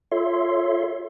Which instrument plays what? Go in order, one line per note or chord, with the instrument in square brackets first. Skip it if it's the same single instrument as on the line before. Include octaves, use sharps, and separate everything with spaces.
[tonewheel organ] F4 A4 C#5 E5 C6